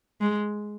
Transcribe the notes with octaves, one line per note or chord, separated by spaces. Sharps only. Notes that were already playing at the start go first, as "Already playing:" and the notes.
G#3